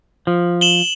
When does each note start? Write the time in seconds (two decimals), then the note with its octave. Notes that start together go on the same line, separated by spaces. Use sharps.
0.27 F3
0.61 E7 F#7 G7